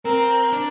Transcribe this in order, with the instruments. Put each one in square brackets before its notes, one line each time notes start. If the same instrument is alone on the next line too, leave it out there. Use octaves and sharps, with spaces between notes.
[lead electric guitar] C4 [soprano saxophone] A#4
[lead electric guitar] D4